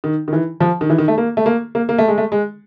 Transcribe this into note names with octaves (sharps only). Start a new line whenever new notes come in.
D#3
D#3
E3
F3
D#3
E3
D#3
A3
A#3
A3
A#3
A#3
A#3
A3
G#3
A3
G#3